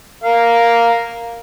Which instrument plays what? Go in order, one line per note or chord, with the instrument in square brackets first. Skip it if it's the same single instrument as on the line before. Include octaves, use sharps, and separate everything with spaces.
[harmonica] A#4 F5